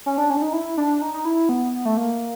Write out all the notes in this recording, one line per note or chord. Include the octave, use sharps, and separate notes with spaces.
C#4
D4
C#4
D4
D#4
E4
D4
D#4
D#4
E4
B3
A3
A#3